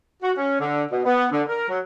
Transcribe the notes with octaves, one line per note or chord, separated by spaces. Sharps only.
F#4
C#4
D3
B2
B3
D3
A#4
F#3